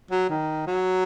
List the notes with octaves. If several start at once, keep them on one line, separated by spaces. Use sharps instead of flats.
F#3
D#3
F#3